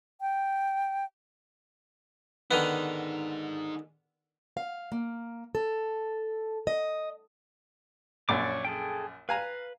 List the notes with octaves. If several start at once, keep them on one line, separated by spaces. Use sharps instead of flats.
G5
D3 D#3 B3 D#4 G#4
F5
A#3
A4
D#5
A#1 F#2 C#5 D5 D6
G#4 A4 G5
B4 F5 G#5 A#5